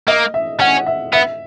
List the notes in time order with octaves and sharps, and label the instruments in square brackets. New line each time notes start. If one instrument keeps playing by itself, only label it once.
[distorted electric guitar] A#3 [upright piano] D#5
[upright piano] E5
[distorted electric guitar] C#4 [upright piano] F#5
[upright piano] E5
[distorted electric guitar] B3 [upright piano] E5